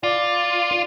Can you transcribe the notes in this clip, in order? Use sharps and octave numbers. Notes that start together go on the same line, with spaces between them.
F4 D5